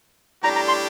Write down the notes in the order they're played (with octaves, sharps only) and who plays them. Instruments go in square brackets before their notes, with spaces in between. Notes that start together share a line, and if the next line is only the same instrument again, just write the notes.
[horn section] A2 G3 D4 G4 [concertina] A#5
[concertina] A#5
C6